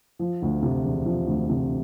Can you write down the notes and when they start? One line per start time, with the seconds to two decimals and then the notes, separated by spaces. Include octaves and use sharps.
0.19 F3
0.42 D2
0.63 C3
0.84 E1
1.05 F3
1.27 D2
1.49 C3